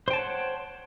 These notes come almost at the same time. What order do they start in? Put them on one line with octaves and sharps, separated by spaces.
C5 G5 A5 C#5 F#5